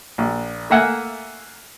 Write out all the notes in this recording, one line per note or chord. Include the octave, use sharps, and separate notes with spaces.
A#1
A3 A#3 E5 F#5 G#5